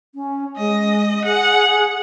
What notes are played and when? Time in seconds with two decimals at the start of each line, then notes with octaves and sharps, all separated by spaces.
0.15 C#4
0.57 G#3 D#5
1.25 G#4 F#5